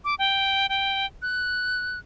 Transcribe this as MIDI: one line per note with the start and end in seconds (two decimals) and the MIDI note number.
0.04 0.15 86
0.19 0.66 79
0.69 1.06 79
1.22 1.99 90